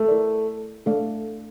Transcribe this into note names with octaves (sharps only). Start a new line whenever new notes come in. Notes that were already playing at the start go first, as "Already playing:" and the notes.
Already playing: A3
E4 A#4 D5
A3 D4 A4 D5 F5